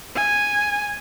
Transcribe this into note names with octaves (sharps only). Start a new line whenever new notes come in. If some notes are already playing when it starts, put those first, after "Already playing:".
G#5